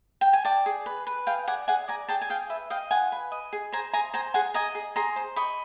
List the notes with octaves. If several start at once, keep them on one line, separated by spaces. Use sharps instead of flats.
G5
G#5
D5 G5 A5
G#4
B4
B4
G#4 F5 G5
D5 F#5 G#5
G#4 F#5 G#5
D5 G#5 A#5
G#4 G5 A5
G#5
G#4 F5 G5
B4 E5
D#5 F5 G5
F4 F#5 G#5
B4
D#5
G#4
C5 G#5 A#5
G#4 G#5 A#5
C5 G#5 A#5
G#4 F#5 G#5
D#5 G#5 A#5
G#4
G#4 A#5 C6
C5
D#5 B5 C#6